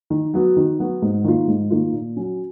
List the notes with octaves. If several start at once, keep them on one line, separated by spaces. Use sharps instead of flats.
D#3
F#3 B3 F#4
D#3
F#3 B3 F#4
G#2
D#3 A#3 F4
G#2
D#3 A#3 F4
A#2
F#3 C#4